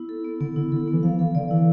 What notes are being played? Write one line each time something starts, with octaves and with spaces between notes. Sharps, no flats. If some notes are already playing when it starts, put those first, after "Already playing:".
Already playing: B3 E4
A4
B3
D3 B3
D3 E4
D3 A4
B3
E3
F3 F5
E3 A4
D3 D5
E3 E4